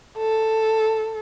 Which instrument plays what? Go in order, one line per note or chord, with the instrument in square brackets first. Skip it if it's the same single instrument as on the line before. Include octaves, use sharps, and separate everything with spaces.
[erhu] A4